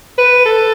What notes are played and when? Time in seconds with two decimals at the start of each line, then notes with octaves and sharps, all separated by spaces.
0.18 B4
0.45 A4